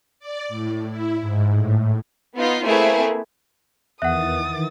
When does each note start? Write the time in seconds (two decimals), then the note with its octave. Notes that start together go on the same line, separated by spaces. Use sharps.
0.19 D5
0.48 A2
0.89 E4
1.21 G#2
1.51 A2
2.35 B3 D#4 F4
2.64 A3 A#3 C4 E4 G#4 B4
4.02 E2 D#3 E3 E5 F#5 D#6 F#6 A6